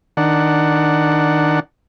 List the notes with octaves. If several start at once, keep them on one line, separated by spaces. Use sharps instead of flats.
D#3 D4 F#5